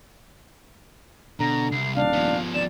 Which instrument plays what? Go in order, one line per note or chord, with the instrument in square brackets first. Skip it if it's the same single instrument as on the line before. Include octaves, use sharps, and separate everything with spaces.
[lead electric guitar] B2 [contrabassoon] D3 [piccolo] A#5
[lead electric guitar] C2 [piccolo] C7
[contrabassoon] D#1 [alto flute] D4 [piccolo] F5
[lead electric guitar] F3 B3
[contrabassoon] G#1 [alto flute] D5 [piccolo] E7